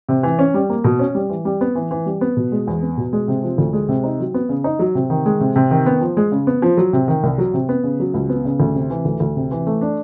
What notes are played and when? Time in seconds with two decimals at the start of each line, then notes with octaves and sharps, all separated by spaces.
0.09 C3
0.23 E3
0.39 C#4
0.54 G3
0.70 A#3
0.84 B2
0.99 C#4
1.15 G3
1.29 E3
1.45 G3
1.61 B3
1.75 E3
1.91 E3
2.06 G3
2.21 B3
2.37 B2
2.52 G#3
2.67 E2
2.82 B3
2.98 B2
3.13 G#3
3.28 C3
3.43 F3
3.58 D2
3.73 G#3
3.88 C3
4.04 D#4
4.19 F#3
4.34 B3
4.49 C#3
4.64 D#4
4.79 F#3
4.95 C3
5.10 D#3
5.26 G#3
5.40 C3
5.56 C3
5.71 D#3
5.86 B3
6.01 F3
6.17 G#3
6.32 C#3
6.47 B3
6.62 F3
6.77 F#3
6.93 C3
7.08 D#3
7.23 C2
7.38 F#3
7.54 C3
7.69 B3
7.83 C#3
8.00 F#3
8.14 C#2
8.29 B3
8.45 C#3
8.60 D2
8.75 C3
8.90 E3
9.05 D2
9.20 D2
9.36 C3
9.51 E3
9.67 A3
9.81 D4